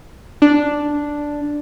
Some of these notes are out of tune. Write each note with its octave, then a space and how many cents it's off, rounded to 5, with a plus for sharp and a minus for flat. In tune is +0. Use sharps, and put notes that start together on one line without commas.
D4 +0